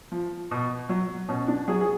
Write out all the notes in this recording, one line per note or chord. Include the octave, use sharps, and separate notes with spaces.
F3
B2
F#3
B2 C#4
D4
F#3 G#4
G#4